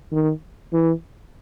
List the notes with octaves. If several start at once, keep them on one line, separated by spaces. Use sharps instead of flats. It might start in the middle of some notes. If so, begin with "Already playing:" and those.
D#3
E3